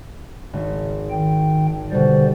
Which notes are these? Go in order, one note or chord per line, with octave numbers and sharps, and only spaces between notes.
G#1
D#3 G5
B2 D3 G3 C5 D5